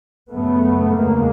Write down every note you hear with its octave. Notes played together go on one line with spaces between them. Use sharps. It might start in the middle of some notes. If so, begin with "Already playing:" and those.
F#2 C#3 A3 B3
E2 C#3 G#3 A#3